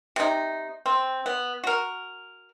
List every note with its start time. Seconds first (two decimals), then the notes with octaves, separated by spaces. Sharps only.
0.16 C3 D#4
0.86 C4
1.26 B3
1.64 F#4 A#4